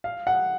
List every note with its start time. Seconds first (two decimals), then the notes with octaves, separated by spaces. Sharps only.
0.04 F5
0.27 F#5